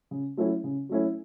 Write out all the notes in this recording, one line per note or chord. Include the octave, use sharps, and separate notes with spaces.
C#3
F#3 A3 C#4 E4
C#3
F#3 A3 C#4 E4